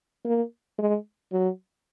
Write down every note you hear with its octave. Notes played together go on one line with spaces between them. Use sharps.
A#3
G#3
F#3